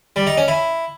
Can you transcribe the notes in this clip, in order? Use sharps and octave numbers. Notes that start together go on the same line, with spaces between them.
G3
D#4
C#4
E4